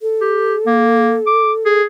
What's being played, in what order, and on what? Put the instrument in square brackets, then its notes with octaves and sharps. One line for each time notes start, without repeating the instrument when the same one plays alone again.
[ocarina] A4
[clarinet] G4
A#3
D6
G#4